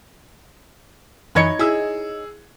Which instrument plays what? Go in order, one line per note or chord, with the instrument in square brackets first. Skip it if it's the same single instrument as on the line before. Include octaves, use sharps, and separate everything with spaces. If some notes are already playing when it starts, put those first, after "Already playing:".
[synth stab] F#2 E3 [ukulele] D#4 C#5 D#5 [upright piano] B5 G#6 C#7
[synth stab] E4 [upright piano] G#4 E6